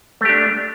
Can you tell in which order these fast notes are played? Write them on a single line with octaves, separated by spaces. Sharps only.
A3 G4 D4